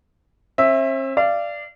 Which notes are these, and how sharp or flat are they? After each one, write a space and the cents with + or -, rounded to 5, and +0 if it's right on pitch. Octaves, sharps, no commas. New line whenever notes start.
C4 +45 E5 +0
D5 +0 F5 -30